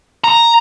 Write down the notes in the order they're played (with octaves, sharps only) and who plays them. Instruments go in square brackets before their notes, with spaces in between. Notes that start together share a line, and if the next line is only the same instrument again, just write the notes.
[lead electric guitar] A#5